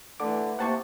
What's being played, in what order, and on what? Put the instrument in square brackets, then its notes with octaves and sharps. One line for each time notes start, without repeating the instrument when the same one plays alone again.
[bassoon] D3 [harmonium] E3 [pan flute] A3 [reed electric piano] D6
[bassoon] C3 [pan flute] A#3 [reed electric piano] F#5 A5 C#6